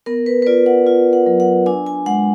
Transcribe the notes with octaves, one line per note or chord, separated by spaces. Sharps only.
B3 A#4
B4
B4
F4 D5
F#5
F4
F#5
F#3
F#5
D4 G#5
G#5
G#3 F#5